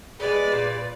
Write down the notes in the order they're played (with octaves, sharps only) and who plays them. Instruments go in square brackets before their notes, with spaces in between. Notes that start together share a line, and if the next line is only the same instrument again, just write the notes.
[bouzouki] G#3 B3 [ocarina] G#4 [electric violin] B4 [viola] D5
[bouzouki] A#2